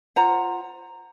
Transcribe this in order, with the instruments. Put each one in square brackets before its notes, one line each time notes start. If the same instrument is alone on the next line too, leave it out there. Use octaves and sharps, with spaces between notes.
[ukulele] F4 C5 F#5 A#5